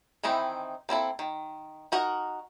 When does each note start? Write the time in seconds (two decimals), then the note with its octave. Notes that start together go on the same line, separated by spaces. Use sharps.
0.23 D#3 E3 C4 D#4 E4
0.89 A#3 C4 E4 A4
1.19 D#3
1.92 D#4 F#4 A#4 D#5